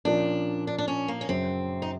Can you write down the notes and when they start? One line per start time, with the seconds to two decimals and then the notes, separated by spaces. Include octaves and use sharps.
0.05 A#2 F3 A#3 C#4 D4
0.67 D4
0.78 D4
0.88 C#4
1.08 A#3
1.21 C#4
1.29 F#2 C#3 F#3 C4
1.82 D#4